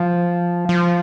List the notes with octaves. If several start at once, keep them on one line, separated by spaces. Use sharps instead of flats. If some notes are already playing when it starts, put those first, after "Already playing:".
Already playing: F3
F3